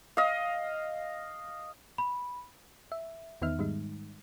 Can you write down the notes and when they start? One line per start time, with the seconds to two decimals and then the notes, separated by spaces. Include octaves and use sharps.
0.17 D#5 F5
1.98 B5
2.92 E5
3.42 E2 D#3 B3 D#4 E5 F6
3.58 G#2 D#3 G3 G#3 D#4